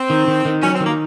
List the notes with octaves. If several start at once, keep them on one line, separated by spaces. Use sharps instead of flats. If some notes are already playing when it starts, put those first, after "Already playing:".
Already playing: C4
D#3
D#3
D#3
F#3 C#4
C4
D#3
A#3